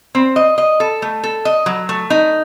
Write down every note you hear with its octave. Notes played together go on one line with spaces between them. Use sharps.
C4
D#5
D#5
A4
A3
A4
D#5
F#3
A3
D#4